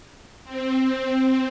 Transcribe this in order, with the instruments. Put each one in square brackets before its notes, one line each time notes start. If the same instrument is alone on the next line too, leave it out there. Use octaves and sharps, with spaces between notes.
[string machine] C4